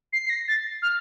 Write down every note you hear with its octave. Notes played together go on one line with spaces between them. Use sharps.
C7
C7
A#6
A6
F6